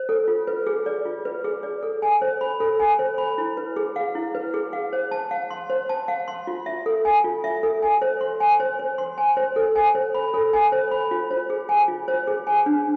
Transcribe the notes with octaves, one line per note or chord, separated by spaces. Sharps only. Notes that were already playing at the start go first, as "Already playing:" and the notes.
Already playing: C5
A4
F4
B4
G#4
D5
F4
B4
G#4
D5
A4
G#5
C5
B5
A4
G#5
C5
B5
E4
B4
G#4
F5
E4
B4
G#4
F5
C5
A5
F5
C6
C5
A5
F5
C6
F4
E5
A4
G#5
F4
E5
A4
G#5
C5
C6
G#5
C5
C5
C6
G#5
C5
A4
G#5
C5
B5
A4
G#5
C5
B5
F4
C5
G#4
G#5
F4
C5
G#4
G#5
D4